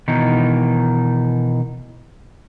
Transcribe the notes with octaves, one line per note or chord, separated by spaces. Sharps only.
B2 D#3 E3 D#4